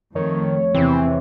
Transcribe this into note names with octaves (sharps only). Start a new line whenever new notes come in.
F2 D#3 A3 C#5
E2 C3 E3 C4